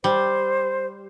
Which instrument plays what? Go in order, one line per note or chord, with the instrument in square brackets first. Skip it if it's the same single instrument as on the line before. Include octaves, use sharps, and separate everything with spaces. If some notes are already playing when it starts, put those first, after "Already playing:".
[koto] G3 [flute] C5